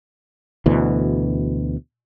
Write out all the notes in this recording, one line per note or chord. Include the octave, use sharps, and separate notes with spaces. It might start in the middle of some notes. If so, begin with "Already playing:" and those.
D2 B2 E3